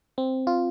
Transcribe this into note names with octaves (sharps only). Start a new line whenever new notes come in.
C4
F4